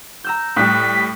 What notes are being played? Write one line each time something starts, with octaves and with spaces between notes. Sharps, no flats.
A#5 E6 G6
A2 G3 F#6 B6